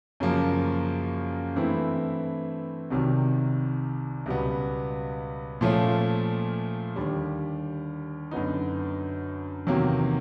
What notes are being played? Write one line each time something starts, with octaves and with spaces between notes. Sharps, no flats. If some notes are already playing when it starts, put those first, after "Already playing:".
F#2 C#3 F3 A#3
G2 E3 A3 C4 E4
C2 C3 D#3 F#3
C#2 B2 G3 B3
A#2 F3 A3 C#4 F4
D#2 D3 G3
F#2 D3 F#3 B3 D#4
E2 C3 D#3 F#3 A#3